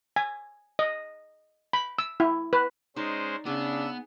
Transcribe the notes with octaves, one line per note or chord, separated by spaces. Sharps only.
G#5
D#5
B5
E6
E4
B4
G#3 C#4 D#4 C5 D5
C#3 B3 D4 G#4 E6